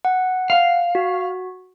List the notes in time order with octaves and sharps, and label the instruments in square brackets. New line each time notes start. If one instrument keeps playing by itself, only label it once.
[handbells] F#5
[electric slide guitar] F5
[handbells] F#4